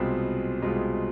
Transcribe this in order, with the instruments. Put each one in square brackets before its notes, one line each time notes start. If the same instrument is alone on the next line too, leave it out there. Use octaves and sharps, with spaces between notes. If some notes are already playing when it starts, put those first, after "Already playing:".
Already playing: [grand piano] C2 B2 G#3 C4 F4
C2 B2 G#3 C4 F4